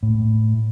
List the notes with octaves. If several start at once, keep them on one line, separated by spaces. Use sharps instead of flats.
A2